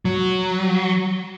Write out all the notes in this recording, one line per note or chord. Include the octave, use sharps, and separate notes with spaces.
F#3